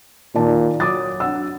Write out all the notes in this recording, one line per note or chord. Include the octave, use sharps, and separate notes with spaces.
A#2 D#3 D5 A5
F#3 D6 D#6 A6
D4 F#5 E6